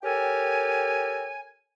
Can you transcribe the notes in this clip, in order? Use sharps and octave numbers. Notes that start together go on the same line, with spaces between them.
G4 A4 A#4 C#5 G5 G#5